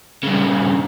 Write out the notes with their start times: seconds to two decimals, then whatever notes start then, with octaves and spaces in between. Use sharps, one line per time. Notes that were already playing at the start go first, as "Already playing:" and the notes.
0.23 G2 C#3